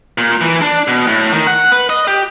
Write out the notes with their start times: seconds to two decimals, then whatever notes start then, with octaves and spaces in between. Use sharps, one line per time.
0.18 A#2
0.41 E3
0.62 D4
0.88 B2
1.07 A2
1.32 D#3
1.47 F#5
1.72 B4
1.89 D#5
2.07 G4